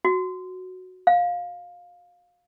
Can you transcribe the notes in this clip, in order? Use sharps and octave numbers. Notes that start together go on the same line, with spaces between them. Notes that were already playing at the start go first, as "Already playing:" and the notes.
F#4
F5